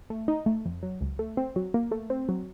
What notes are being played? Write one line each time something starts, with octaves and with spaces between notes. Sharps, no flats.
A3
D#4
A3
F2
F#3
C#2
A3
C4
F#3
A#3
A3
C4
F#3